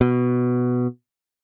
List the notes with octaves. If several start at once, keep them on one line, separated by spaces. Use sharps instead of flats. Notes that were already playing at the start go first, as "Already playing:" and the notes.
B2